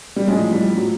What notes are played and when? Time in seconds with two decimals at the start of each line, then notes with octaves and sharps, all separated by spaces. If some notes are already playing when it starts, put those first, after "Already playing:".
0.16 G3
0.27 A1 A2 F3 G#3
0.51 G3
0.75 A2 F3 F#3